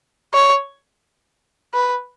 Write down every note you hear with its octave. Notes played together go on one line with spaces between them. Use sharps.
C#5
B4